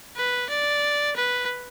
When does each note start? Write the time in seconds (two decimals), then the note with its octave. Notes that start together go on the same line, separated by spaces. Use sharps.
0.17 B4
0.50 D5
1.16 B4